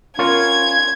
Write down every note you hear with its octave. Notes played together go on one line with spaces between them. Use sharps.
B3 C#4 F4 A#4 C#5 G#6